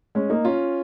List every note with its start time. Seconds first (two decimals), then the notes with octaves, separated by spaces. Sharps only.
0.15 G#3 C#4
0.30 A#3 D#4
0.45 C#4 F4